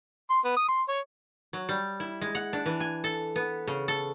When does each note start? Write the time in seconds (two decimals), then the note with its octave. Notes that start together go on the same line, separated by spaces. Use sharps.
0.30 C6
0.45 B3
0.57 D#6
0.68 C6
0.89 C#5
1.53 F#3
1.69 G3
2.00 E4
2.22 G#3
2.35 F#5
2.53 D4
2.66 E3
2.80 G#5
3.04 A4
3.36 B3
3.67 C#3
3.88 A4